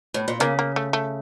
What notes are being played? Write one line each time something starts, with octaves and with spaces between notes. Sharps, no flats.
A2
A#2
C#3 A#3
A#3
A3
A3